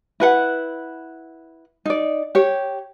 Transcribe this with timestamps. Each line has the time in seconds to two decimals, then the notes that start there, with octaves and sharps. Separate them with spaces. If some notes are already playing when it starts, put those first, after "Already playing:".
0.20 E4 B4 F#5
1.86 D#4 D5
2.35 G4 C#5